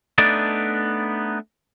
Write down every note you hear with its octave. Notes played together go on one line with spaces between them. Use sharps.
A3 B3 D4 D#4 D5